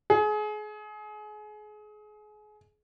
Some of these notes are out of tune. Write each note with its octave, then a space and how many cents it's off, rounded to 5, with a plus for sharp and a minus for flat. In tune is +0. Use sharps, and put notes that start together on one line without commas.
G#4 +30